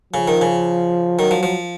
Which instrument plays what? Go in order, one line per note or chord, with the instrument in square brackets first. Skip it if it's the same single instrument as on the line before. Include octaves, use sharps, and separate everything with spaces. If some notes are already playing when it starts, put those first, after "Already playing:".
[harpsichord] C#3 [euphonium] F3
[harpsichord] D#3
C#3
[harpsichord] D#3 [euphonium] F#3
[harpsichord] F3
F3